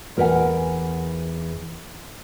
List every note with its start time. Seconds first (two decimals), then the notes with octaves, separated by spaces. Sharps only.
0.17 E2 A#4 B4 C#5 F#5 G#5